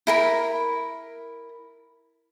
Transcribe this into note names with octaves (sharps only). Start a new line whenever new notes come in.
E4 A#4 B5